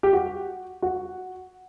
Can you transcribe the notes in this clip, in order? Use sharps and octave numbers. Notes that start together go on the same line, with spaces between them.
G4
F#4
F#4